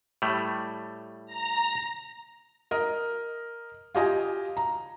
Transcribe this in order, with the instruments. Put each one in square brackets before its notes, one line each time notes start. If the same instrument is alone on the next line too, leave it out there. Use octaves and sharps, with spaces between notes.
[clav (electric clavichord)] A2 G3 A3
[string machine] A#5
[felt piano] A#4 D#5
F4 G4 D#5 G#5
A#5